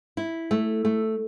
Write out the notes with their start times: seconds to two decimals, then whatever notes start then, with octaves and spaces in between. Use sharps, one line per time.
0.17 E4
0.51 A3
0.85 A3